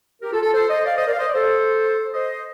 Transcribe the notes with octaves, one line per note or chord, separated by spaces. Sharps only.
G4 A#4
F4 A4
F4 A4
A4 C5
C5 D#5
D5 F5
C5 D#5
A#4 D5
F5
C5 D#5
D5
A4 C5
C5 D#5